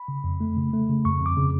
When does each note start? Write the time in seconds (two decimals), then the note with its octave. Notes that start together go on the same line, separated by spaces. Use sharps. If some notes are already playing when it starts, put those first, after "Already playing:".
Already playing: B5
0.08 C#3
0.24 F2
0.41 A3
0.57 C#3
0.73 A3
0.89 C#3
1.05 F2 C#6
1.21 F2
1.26 D6
1.37 C#3